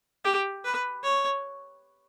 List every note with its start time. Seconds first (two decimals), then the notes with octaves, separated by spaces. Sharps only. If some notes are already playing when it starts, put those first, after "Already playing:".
0.25 G4
0.65 B4
1.03 C#5